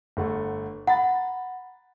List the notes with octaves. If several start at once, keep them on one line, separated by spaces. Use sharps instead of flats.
G1 A3 F#5
F#5 A#5 B5 A6